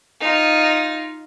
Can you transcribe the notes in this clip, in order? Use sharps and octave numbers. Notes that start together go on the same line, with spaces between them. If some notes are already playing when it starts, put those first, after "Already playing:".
D#4 F4